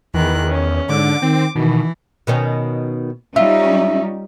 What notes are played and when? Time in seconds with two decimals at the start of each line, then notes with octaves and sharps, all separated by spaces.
0.14 E2 D#3 E3 F#6
0.47 C#4
0.89 G#2 D3 D6
1.22 D#3 C4
1.55 B2 D#3 E3
2.27 B2 D#3 C#4
3.36 G3 C#4 D#4 F4 E5